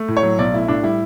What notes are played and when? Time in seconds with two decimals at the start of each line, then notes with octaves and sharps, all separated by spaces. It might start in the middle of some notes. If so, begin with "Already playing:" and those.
Already playing: A3
0.08 A2
0.17 C#5
0.23 F#3
0.38 B1 D5
0.53 A3 E4
0.68 A2 D4
0.83 G3 E4